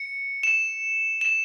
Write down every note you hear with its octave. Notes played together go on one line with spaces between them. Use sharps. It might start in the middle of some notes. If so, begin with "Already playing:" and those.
Already playing: C#7
E7
E7